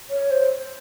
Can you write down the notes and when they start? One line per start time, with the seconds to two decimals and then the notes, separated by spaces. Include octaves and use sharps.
0.10 C#5
0.31 C5